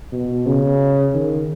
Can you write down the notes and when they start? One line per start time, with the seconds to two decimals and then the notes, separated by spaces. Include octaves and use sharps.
0.13 B2
0.46 C#3
1.14 D#3